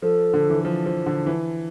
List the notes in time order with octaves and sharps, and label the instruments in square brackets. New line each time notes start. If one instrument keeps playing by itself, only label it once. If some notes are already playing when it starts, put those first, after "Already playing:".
[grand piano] F3 [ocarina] A4
[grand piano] D3
E3
F3
F3
D3
E3